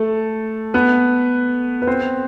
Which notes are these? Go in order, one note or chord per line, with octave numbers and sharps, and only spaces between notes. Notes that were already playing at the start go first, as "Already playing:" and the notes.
Already playing: A3 A4
B3 B4
B4
C4 C5